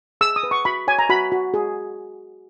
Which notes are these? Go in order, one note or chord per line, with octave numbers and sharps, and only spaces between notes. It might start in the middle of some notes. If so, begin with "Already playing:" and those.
G#4 E6
D#6
B4
C#6
F#4 B5
C#5 G#5
A#5
F#4 B5
F#4
G#4